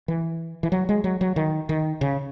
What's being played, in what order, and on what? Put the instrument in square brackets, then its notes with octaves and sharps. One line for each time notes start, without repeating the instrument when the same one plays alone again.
[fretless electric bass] E3
E3
F#3
G#3
F#3
F#3
D#3
D#3
C#3